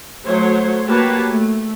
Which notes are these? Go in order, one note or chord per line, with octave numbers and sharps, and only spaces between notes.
F#3 A3 C5 C#5
A#3 F#4 G4 B4 C#5 A5
A3